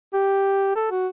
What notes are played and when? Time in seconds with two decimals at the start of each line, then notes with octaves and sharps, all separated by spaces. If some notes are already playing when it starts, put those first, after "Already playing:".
0.13 G4
0.76 A4
0.91 F#4